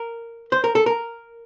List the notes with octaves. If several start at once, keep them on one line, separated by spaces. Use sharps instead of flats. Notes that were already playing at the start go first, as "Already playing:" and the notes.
Already playing: A#4
C5
A#4
A4
A#4